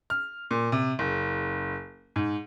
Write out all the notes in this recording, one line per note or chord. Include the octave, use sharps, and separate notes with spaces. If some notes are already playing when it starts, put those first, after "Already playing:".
F6
A#2
C3
F#1
G#2